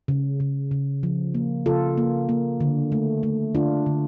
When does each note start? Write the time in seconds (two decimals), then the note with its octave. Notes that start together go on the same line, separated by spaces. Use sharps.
0.08 C#3
0.40 C#3
0.71 C#3
1.03 F3
1.34 A#3
1.66 C#3 F4 A4
1.98 A#3
2.29 A#3
2.60 D3
2.92 A3
3.23 A3
3.55 D3 D4 F4
3.86 D3